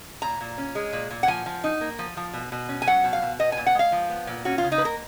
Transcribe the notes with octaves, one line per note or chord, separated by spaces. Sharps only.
A#2 A#5
A#2
C#4
G#3
A#2
A#2
F#5
F3 G#5
F3
D#4
A#3
F3
F3
B2
B2
C#4
G#5
F#3 F#5
B2
F5
B2
B3 D#5
G#5
A#2
F#5
G#3 F5
F3
B3
A#2
C#4 F#4
F4
C#3
D#4
B4
A#3 A#4